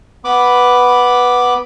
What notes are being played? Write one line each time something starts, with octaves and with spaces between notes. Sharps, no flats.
B3 B4 B5 D6